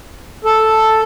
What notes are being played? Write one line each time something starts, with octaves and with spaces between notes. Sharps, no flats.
A4